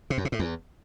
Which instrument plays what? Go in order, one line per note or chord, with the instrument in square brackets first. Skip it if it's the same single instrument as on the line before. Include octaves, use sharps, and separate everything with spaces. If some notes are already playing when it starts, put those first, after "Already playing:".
[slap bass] C3
F#2
C3
A2
E2